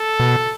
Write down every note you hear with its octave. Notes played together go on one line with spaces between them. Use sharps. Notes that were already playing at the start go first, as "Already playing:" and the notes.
Already playing: A4
B2